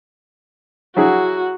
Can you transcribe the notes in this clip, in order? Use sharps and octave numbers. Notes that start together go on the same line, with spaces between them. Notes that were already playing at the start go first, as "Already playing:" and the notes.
F#3 E4 F#4 G#4